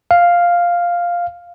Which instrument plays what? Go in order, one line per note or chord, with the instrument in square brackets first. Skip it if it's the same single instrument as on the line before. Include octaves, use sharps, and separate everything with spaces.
[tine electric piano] F5